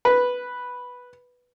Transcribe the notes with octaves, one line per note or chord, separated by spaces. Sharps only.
B4